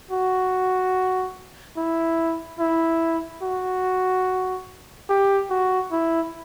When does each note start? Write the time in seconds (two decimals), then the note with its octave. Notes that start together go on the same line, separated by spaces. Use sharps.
0.11 F#4
1.77 E4
2.59 E4
3.43 F#4
5.09 G4
5.50 F#4
5.92 E4